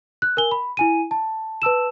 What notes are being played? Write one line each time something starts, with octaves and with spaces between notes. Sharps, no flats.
F#6
A#4 G#5 G7
B5
E4 G#5 D#7
A5
B4 A5 E6 E7